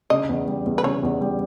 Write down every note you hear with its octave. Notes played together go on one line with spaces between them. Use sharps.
C#3 D#5
E2
G3
E2
B4
C#3 C#5
E2
G3